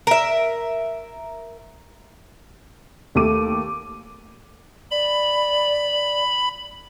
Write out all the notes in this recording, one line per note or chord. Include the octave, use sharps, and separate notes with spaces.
A#4 E5
D#2 A3 G4 D6 D#7
D5 B5